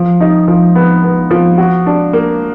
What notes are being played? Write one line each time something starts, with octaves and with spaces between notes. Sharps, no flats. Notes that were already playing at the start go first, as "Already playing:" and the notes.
Already playing: F3
D#4
F3
B3
B3
F3
F#4
D4
A#3